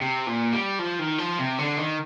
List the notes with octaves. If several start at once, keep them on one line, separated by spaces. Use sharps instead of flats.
C3
A#2
G3
F3
D#3
F3
C3
D3
D#3